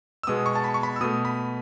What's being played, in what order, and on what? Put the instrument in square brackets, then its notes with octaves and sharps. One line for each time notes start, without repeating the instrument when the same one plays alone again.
[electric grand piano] E6
B2 G#3 B3 D#6
C#6
A5
B5
C#6
B5
E6
B2 A3 D#6
B5